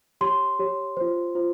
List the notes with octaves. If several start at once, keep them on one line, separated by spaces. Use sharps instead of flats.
G4 C#5 C6
G4 C#5
F4 C5
F4 C5